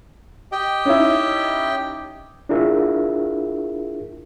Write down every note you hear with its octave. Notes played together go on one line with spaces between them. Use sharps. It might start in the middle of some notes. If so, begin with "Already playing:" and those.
G4 D#5 G5
C#4 D#4 E4
D4 E4 F4 G#4 A#4 E5